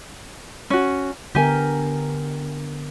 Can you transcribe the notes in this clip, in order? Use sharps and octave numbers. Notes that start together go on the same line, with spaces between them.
C#4 F#4
D3 B3 G4 A#4 G#5